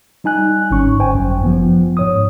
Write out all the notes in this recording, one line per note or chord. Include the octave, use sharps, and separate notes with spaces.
G3 D#4 G#5 F#6
G1 G#2 C#4 C#6
C5 G5 G#5
G1 F#2
F3 B3
G#2 C#5 D#6